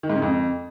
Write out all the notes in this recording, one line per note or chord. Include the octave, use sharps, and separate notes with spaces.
D#3
G#2
C#3
F2